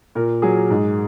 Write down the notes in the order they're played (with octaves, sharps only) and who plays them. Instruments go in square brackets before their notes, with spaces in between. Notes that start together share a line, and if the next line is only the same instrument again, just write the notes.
[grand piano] A#2 A#4
F#3 G#4
G#2